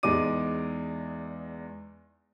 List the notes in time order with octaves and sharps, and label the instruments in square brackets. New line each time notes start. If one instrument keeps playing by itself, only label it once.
[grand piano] E2 G#3 D#4 D5 D6 D#7